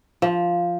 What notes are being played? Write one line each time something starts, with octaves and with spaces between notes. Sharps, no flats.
F3